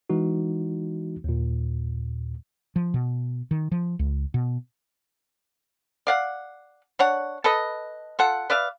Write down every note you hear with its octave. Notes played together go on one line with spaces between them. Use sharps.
E3 G#3 D#4 F#4
D#2 A#2
F3
B2
D#3
F3
C#2
B2
D5 F5 F#5
D4 C#5 F#5
A4 B4 D#5
F4 A4 F#5
B4 D5 E5 F5